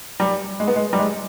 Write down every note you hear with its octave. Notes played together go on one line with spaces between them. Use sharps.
G3
G#3
B3
G#3
G3
G#3